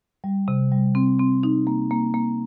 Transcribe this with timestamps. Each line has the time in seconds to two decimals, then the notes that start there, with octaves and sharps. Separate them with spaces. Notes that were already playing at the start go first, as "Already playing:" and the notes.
0.24 G3
0.48 C3
0.72 G3
0.95 C4
1.19 C4
1.43 D#4
1.67 A#3
1.91 A#3
2.14 A#3